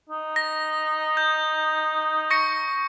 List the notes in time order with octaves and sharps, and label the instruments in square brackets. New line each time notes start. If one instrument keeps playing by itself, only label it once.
[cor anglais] D#4
[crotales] A#6
G6
C#6 A#6 C#7